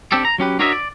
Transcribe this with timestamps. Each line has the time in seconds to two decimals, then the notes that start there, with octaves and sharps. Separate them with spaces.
0.12 C4 D4 G4 A4
0.25 A#5
0.38 F#3 C#4 G4 B4
0.59 D4 F#4 A#4 C#5 D#5 E5
0.72 D5